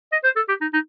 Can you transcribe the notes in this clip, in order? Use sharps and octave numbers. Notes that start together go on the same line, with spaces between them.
D#5
C5
A4
G4
D#4
D#4